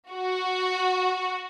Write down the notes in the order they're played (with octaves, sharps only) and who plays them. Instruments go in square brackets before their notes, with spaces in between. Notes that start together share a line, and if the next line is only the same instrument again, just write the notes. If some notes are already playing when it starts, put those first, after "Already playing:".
[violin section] F#4